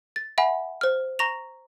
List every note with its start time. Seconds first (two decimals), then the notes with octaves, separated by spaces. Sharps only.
0.16 A6
0.38 E5 F#5 G#5 B5
0.81 C5 F6
1.19 A#5 C#6 A#6 F7